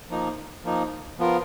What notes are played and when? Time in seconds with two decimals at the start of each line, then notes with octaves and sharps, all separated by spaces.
0.09 F3 A#3 D#4
0.64 F3 A#3 D#4
1.19 F3 B3 F4 A#4